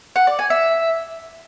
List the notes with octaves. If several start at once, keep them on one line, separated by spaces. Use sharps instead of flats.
F#5
D5
G#5
E5